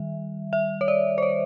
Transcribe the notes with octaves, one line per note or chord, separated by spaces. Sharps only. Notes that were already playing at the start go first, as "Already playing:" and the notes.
Already playing: D#3 G3 E5
E5
C#5
D5
C5
C#5